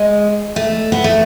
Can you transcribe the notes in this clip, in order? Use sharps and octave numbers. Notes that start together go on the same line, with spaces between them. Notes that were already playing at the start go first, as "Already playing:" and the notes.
Already playing: G#3
A3
B3
A3